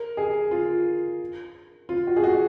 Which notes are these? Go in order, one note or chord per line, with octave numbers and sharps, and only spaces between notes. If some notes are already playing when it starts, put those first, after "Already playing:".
Already playing: A#4
G#4
F4
F4
F#4
G#4
F#4